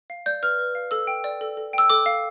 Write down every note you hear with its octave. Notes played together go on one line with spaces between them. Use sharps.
F5
D5 G6
B4 F6
B4
F5
A4 E6
G5
D5
A4
A4
G5 E6
A4 D6
F5